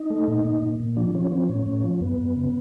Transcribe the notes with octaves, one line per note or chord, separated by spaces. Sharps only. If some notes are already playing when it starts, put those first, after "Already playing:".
Already playing: D#4
A3
A#2
A#2
A#2
A#2
F3 D4
F3 C#4
F3 C4
A2 C#4
A2
F3
F#2 B3
F#2
C#3